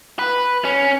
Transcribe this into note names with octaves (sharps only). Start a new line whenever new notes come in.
B4
C#4